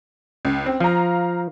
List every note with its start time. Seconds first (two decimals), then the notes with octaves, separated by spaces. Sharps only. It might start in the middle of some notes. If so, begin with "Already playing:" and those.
0.45 C#2
0.66 C4
0.80 F3 F5 A#5